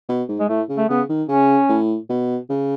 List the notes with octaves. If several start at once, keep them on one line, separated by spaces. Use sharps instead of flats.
B2
G#2
G#3
A2 A3
C#3
A3
C#3 B3
D#3
C#3 C#4
A2
B2
C#3